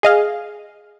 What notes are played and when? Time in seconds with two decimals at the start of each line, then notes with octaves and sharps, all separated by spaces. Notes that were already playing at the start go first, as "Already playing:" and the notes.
0.03 G#4 D#5 F5